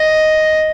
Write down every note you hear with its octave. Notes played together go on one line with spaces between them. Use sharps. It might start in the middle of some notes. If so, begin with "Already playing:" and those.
Already playing: D#5